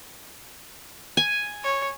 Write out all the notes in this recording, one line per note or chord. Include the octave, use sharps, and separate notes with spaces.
G#5
C#5